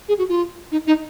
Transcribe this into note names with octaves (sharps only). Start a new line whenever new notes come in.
G#4
F#4
F4
D#4
D#4